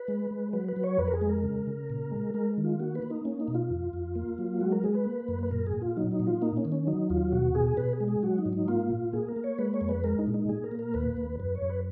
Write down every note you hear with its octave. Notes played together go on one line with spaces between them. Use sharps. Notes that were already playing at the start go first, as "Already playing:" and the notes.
Already playing: B4
G#3
G#3
F#3 B4
B4
F#3
C#5
F2 B4
A#4
G#4
G#3
A#4
C#3
C#3
A#2
G#3
G#3 A#4
D#3
F4
A#3 F#4
B4
A#3
D#4
A#3 C#4
D#4
B2
F4
F2
F2
A#3
F#3
G#3 F#4
A#4
G#3 G#4
B4
A#3
F#2
B4
A#2 A#4
G#4
A#2
F4
F#3 D#4
D#4
A#2
F4
A#3 D#4
C#4
D#3
C#4
F#3 D#4
D#2 F4
B2 F#4
B2 G#4
B2 B4
G#4
G#3
G#4
F#3 F#4
D#4
G#2
D#4
A#3 F4
A#2
A#3 G#4
A#4
A#3
C#5
G#3 B4
C#5
F2
B4
G#3 A#4
D#4
A#2
D#4
A#2 G#4
A#4
A#3
A#4
D#2 B4
D#2
F#2 B4
C#5
F#2
B4